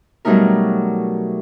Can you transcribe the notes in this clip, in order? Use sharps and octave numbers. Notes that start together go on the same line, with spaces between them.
B2 F#3 G3 A3 D#4 A#4